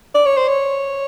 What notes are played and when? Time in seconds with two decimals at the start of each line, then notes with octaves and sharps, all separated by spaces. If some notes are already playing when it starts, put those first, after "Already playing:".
0.15 D5
0.26 C#5
0.37 C5
0.49 C#5